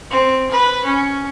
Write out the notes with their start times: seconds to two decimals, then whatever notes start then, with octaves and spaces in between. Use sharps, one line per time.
0.10 C4
0.51 B4
0.84 C#4